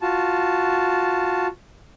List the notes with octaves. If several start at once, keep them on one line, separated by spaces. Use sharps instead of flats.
F4 F#4 A5